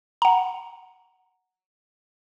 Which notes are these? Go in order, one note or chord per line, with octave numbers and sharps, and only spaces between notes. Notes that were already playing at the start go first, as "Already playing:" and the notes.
F#5 A#5